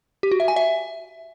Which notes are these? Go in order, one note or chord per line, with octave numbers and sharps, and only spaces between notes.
G4
F#4
E5
G#5
E5